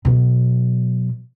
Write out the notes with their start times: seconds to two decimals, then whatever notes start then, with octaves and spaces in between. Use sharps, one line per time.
0.05 B2 F#3